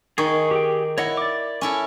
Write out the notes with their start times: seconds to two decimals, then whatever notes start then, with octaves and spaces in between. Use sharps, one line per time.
0.18 D#3 G#4 C#6
0.51 G4 G#4 G5
0.98 E4 C#5 D#5 F#5
1.17 D5 D6
1.61 C#4 E4 A4